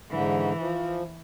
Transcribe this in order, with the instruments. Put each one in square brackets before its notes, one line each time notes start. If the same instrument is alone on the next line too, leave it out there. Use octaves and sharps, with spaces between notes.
[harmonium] G#2 D3 [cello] E3
[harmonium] F3